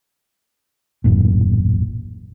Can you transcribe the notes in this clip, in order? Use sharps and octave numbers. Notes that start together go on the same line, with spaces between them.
D#1 A1 F#2 A#2